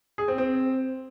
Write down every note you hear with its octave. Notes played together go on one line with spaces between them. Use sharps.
G#4
C4
C4